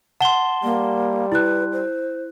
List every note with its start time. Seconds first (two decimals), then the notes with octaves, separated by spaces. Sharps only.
0.21 F#5 A5 C6 G7
0.64 G3 A#3
1.32 E4 B4 F#6
1.72 C5